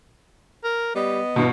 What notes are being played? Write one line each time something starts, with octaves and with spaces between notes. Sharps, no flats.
A#4
G3 B3 D#5
G2 B2 E3